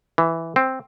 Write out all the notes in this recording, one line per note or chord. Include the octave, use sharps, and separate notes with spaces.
E3
C4